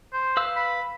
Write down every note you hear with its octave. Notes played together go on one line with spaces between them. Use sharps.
C5
B4 F5 E6
B5